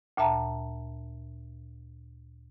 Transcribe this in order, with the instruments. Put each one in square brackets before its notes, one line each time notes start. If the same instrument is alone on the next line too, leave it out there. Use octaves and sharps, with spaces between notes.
[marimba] D2 A#2 E5 A5 A#5